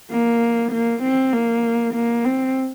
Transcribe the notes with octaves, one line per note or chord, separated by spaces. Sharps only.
A#3
A#3
C4
A#3
A#3
C4